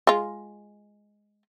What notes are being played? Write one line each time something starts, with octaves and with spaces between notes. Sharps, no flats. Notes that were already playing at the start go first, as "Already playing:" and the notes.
G#3 F4